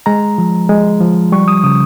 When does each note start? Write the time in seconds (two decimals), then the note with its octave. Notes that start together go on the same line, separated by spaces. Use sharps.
0.06 G#3 A#5
0.38 F3
0.69 G#3
1.01 F3
1.32 G3 C#6
1.48 D#6
1.63 C#3 D#6